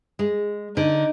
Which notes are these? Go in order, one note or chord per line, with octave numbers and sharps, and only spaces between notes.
G#3
D3 D#4